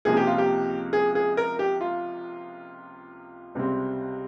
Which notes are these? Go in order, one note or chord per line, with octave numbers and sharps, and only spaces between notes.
C#2 C3 F3 A#3 G#4
G4
F4
G4
G#4
G#4
A#4
G4
F4
C#2 C3 G3 C4